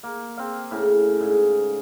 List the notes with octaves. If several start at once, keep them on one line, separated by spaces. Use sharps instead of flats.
A#3
C4 F5
A2 C#3
G#2